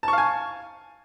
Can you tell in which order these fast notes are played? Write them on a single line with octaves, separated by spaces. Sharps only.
A5 C#6 F5 G#5